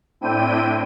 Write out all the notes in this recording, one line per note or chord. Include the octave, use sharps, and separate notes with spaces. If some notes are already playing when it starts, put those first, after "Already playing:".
A2 C4 D4 E4 G5 D#7